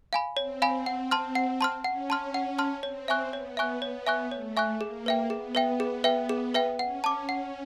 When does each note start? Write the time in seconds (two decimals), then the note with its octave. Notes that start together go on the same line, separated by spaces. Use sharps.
0.13 F5 G#5 B5
0.37 C4 C#5
0.62 F5 G#5 B5
0.86 F#5
1.11 A5 C6 F6
1.35 F#5
1.61 A5 C6 F6
1.84 C#4 F#5
2.10 A5 C6 F6
2.34 F#5
2.59 A5 C6 F6
2.83 C4 C#5
3.08 E5 G#5 C#6 F#6
3.33 B3 C#5
3.57 E5 G#5 C#6 F#6
3.82 B3 C#5
4.07 E5 G#5 C#6 F#6
4.31 A3 C#5
4.57 E5 G#5 C#6 F#6
4.81 A#3 G#4
5.06 B4 E5 G5
5.30 B3 G#4
5.55 B4 E5 G5
5.80 G#4
6.04 B4 E5 G5
6.29 G#4
6.54 B4 E5 G5
6.79 C#4 F#5
7.04 A5 D6
7.29 C#4 F#5